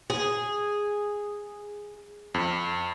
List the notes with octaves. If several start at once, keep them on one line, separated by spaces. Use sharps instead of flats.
G#4
F2